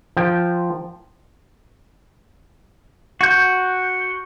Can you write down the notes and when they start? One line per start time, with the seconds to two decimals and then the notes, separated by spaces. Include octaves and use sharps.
0.17 F3 G5
3.21 F#4 G6